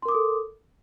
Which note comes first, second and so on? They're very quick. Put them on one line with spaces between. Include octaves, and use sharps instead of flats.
C6 A#4 D6 D#6 A4